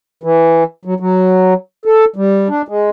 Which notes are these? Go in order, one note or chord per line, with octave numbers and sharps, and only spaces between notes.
E3
F#3
F#3
A4
G3
D4
G#3